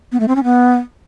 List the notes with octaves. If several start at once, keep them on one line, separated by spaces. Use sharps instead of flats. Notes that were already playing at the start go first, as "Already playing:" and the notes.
B3
A3
C4
C#4
B3